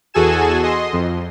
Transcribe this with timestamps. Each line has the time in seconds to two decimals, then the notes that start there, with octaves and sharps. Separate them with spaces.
0.14 E2 F#4 G#4 A4 G#5 E7
0.63 D#5 C6
0.93 F2